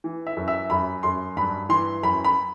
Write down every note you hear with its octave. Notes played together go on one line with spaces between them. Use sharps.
E3
E5
F#2
E5
F#2 B5
F#2 C6
G2 B5
E3 C6
F#2 B5
B5